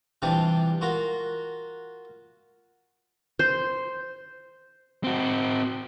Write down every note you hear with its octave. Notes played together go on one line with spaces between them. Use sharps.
C3 E3 F3 G3 D4 F4
F4 F#4 A#4
C5
C4 F#4